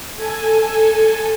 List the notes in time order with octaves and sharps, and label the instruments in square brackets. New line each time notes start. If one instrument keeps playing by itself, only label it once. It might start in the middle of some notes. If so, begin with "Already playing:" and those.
[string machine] A4 G#5